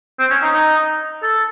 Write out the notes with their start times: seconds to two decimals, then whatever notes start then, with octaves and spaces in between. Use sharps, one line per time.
0.19 C4
0.31 C#4
0.42 D#4
0.54 D#4
1.23 A4